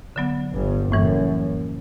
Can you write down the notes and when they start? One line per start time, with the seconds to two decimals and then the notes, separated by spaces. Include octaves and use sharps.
0.16 D3 F#3 B3
0.54 G1 G2
0.92 F#1 F#2 A2 E3 G3